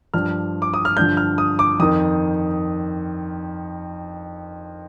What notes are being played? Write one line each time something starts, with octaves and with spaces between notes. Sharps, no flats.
G2 F3 F6
D6
D#6
F6
G2 D3 F3 G6
F6
D#6
D6
F2 D#3 D#6